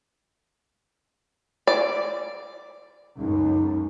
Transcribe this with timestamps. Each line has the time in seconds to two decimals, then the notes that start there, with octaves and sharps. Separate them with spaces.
1.67 D5
3.19 C#2 F#2 D#4